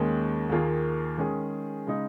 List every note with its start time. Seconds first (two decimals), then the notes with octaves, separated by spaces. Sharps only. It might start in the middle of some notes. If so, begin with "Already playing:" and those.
Already playing: D#2 D#3 G#3 C#4
0.49 D#2 D#3 A#3 F4 G#4
1.18 D#3 G#3 C#4 G#4
1.87 C#3 G#3 D#4